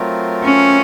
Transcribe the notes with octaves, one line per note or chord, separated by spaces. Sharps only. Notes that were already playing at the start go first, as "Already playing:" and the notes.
Already playing: F#3 A3 C4 F4 A#4
C#4